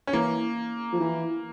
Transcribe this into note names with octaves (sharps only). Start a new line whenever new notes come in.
C#4
E3 A#3
F3
E3